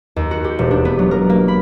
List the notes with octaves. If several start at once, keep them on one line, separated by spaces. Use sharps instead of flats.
D#2
F#4
G4
E1
D4
B3
F#3
A#4
A#3
B5